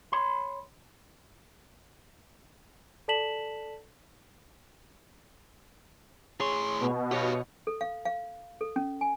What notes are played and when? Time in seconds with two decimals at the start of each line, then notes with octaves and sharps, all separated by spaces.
0.12 C#5 B5 C6
3.08 A4 D5 A5 B6 E7 F#7
6.40 A2 G#4 C#5 C6
6.80 B2
7.11 F#4 G4 C#5 D#5 F5
7.67 A4
7.81 F5
8.05 F5
8.61 A4
8.76 C#4
9.01 G#5